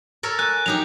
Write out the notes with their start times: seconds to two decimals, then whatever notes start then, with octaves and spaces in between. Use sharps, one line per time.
0.23 A4 A#4 C#5
0.39 G#5 F#6
0.66 F#3 D#4 G4 F7